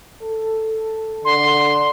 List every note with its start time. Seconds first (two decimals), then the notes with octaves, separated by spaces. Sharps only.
0.22 A4
1.24 D3 C6